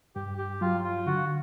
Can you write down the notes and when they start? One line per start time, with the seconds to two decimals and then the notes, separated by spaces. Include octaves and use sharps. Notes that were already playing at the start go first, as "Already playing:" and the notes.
0.16 G2 G4
0.38 G4
0.61 F#3 F4
0.84 F4
1.06 D3 F#4